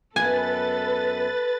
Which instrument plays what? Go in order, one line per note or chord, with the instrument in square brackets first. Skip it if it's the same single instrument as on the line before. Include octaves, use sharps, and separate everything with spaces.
[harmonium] F#2 B3 [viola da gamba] A4 [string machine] B4 A6 [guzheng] G#5